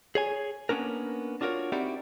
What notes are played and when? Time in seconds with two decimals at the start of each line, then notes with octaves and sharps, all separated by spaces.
0.15 G#4 C#5 G#5
0.69 A#3 B3 C#4 D4 A#4
1.41 D4 F4 F#4 G#4 A#4 C#5
1.72 C4 D#4 E4 F#4 G4 D5